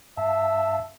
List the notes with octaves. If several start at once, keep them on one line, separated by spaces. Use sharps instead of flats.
G2 E5 F5 A5